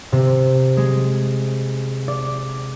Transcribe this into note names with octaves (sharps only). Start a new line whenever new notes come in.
C3
G#3
D5